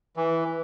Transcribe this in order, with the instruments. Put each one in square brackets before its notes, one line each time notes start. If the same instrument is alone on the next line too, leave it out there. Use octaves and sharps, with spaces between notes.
[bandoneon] E3